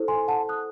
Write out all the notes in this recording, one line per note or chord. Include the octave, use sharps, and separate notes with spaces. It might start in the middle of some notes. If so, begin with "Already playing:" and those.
Already playing: E4 A4 C5
G#5 C6
F#5 A5
D#6 F#6